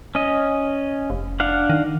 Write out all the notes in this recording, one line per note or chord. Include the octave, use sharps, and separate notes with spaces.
C#4 D#5
F1
D4 F5 F#5
D#3